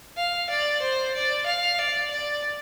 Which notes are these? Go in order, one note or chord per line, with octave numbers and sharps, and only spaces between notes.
F5
D5
C5
D5
F5
D5
D5